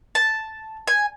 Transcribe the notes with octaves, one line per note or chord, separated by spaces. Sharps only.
A5
G#5